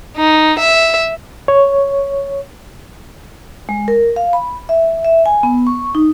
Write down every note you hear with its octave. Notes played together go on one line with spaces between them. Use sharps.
D#4
E5
C#5
G#3
A#4
F5
B5
E5
E5
G#5
B3
C#6
D#4